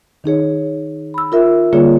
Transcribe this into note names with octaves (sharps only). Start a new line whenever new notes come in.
D#3 D#4 G#4 C#5
B5 E6
F4 A#4 E5
D3 G3 A#3 F4 G#4 C#5